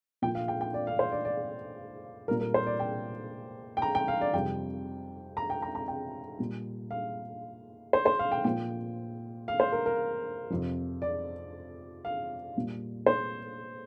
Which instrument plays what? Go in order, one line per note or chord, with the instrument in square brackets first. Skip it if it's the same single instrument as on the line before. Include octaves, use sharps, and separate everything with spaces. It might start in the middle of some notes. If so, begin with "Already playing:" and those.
[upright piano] A#2 F3 G5
F5
G5
G5
D5
F5
C5
D5
D5
A#2 G3 A#4
A#4
C5
D5
G5
G5
A#5
G5
F5
D5
F2 C3 G3 G5
A#5
G5
A#5
A#5
G5
A#2 G3
F5
C5
C5
F5
G5
A#2 F3 G5
F5
C5
A#4
A#4
F2 C3 F3
D5
F5
A#2 G3
C5